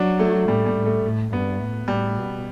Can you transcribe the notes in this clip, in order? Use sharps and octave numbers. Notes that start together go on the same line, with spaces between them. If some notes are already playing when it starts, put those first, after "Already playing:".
Already playing: F#3 D4
A3
A2 G3
G3
A2
A3
A2
G2 B3
A2
A2 G3
B2